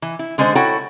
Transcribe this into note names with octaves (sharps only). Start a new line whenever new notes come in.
E3
E4
D3 G#3 C#4 D4 C5
E4 F#4 A4 C#5 F#5 G5